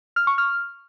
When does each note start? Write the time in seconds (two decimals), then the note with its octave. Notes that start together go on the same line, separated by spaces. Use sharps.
0.16 F6
0.27 C#6
0.38 F6